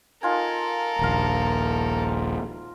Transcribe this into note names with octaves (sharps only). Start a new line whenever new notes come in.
D#4 F4 A4 A#4 G#5
D#1 A#1 F5 A#5